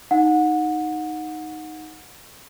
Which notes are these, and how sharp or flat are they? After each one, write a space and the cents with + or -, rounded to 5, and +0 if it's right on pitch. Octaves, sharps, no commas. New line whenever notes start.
D#4 +0 F#5 -25